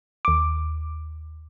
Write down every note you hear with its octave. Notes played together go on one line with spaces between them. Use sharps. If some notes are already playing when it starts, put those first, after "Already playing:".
D#2 D6